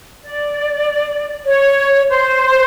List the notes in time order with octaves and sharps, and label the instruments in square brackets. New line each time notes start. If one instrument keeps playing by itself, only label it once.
[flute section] D5
C#5
C5